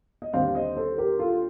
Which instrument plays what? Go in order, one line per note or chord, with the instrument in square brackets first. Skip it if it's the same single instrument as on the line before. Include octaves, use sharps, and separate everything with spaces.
[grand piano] D#5
[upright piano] D#2 D3 G3 C4 [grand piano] D5 F5
[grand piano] F5
C5 D#5
A4 C5
G4 A#4
F4 A4